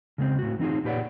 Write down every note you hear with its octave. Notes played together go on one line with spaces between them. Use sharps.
C#3 G#3 C4
A2 F#4
E3 C4 D#4 F4 G#4
A#2 G4 B4 C#5 D5 F#5